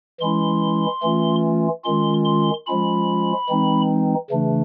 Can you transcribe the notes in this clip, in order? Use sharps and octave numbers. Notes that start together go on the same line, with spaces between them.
E3 G#3 C#4 E4 C6
E3 A3 C#4 F4
D#3 G#3 C#4 F4 C6
C6
F3 G#3 C#4 F4 B5
E3 G#3 C4 D#4
C#3 E3 A3 D4